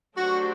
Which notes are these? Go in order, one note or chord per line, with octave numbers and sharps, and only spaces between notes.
F#3 A3 D4 F#4 G4 C5